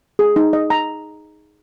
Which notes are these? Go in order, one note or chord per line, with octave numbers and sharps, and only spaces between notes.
G#4
D#4
D#5
A#5